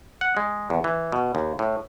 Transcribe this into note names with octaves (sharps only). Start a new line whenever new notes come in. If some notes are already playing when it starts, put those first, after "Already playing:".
F#5
G#3
E2
E3
B2
D#2
A2